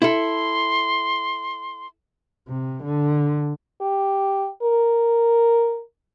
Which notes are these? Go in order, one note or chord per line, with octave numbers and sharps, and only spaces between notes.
E4 A4 C6
C3
D3
G4
A#4